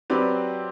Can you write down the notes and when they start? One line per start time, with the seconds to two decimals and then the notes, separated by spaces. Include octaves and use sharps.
0.10 F#3 C4 G4 B4 D5